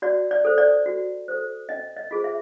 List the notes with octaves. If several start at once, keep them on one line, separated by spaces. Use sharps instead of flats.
F#4 D5
D5
A4 C5
D5
F#4
A4 C5
C#4 D#5
D#5
F4 G#4 C5
E5